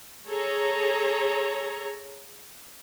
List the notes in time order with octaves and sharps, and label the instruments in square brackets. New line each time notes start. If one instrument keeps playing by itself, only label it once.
[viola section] G#4 A4 C#5 A#5